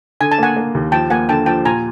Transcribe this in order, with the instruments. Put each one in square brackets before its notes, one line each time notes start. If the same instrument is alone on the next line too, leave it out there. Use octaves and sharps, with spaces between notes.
[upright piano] D3 [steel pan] G#5
[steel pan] A5
[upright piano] A#3 [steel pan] F#5 G#5
[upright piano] A#3
D#2
[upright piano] F3 [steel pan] G5 A5
[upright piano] A#3 [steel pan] F#5 G#5
[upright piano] D3 [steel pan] G5 A5
[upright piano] F3 [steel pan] G5 A5
[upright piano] A#2 [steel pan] G#5 A#5